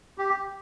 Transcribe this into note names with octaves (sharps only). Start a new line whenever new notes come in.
G4